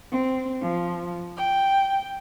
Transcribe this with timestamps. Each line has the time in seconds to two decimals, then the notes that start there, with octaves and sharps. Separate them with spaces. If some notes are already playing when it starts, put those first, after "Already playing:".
0.11 C4
0.62 F3
1.36 G5